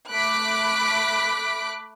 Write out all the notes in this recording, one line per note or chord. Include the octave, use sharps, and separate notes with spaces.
A3 B5 D6 F#6 B6 D7